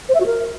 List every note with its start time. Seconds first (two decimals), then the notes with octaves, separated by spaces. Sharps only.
0.09 C5
0.15 E5
0.20 F#4
0.26 A#4